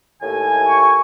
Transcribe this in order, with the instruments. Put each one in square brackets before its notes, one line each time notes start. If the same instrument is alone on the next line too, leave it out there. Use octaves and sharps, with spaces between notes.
[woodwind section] D#2 A2 G#5
[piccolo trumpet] C#6